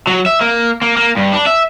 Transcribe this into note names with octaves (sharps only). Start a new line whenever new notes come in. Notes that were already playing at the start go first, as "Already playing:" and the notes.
F#3
E5
A#3
A#3
A#3
G2
D4
E5